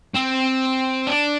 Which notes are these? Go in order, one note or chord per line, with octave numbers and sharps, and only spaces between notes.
C4
D4